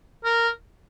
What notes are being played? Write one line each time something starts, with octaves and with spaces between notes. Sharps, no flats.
A#4